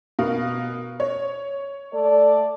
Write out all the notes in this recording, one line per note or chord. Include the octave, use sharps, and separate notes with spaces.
B2 A#4 F5
C#5
A3 A4 D5